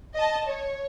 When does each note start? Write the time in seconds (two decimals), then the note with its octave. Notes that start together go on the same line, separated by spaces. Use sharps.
0.14 D#5 A5
0.47 C#5